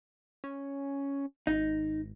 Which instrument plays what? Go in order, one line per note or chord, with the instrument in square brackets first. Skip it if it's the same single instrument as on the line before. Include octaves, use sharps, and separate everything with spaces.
[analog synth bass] C#4
[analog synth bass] G#1 [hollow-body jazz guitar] D#4